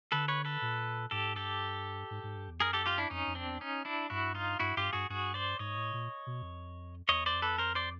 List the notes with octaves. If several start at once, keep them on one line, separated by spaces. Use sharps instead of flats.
D3 A4 B4
B4 C#5
A4 B4
A#2
G#2 G4 A4
G2 G4 A4
G#2
G#2
G2
E2
F#2 G#4 A#4
G4 A4
F4 G4
D4 E4
F2 C#4 D#4
F2
C4 D4
E2
C#4 D#4
D4 E4
G2 E4 F#4
D#4 F4
G2 E4 F#4
G2 F4 G4
G2 F#4 G#4
G2 F#4 G#4
C5 D5
G#2 C#5 D#5
A2
A#2
B2
F2
E2 C#5 D#5
C5 D5
F2
A4 B4
A#4 C5
C5 D5